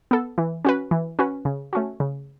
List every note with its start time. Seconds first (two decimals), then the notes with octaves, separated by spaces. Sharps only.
0.11 B3 A4
0.38 E3
0.65 C#4 F#4 B4
0.91 E3
1.19 C#4 F#4 B4
1.45 C#3
1.73 A3 C#4 F#4
2.00 C#3